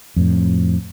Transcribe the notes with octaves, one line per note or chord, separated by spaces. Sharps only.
F2 A2